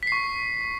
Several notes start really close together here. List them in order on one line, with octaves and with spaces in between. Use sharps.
B6 C7 C#6